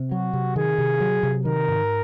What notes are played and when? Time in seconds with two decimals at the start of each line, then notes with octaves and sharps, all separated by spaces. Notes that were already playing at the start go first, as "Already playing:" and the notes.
Already playing: C3
0.11 F#3 F#4
0.33 C3
0.56 D#3 G#4
0.78 C3
1.00 F#3
1.23 C3
1.45 D#3 A#4
1.68 G#2